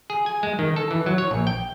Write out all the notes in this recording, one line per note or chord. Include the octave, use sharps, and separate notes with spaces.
G#4
G#5
G#3
D#3
A4
E3
F#3
C#5
A#1
G5